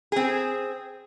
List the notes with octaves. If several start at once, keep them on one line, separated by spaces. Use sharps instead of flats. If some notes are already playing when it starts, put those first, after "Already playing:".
C4 G#4